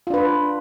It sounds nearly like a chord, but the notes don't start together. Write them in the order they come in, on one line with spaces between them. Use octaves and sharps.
F4 D4 B4